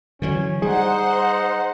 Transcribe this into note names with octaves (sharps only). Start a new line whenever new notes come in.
D3 E3 F#3 C#4
G3 D#4 G#4 C5 F#5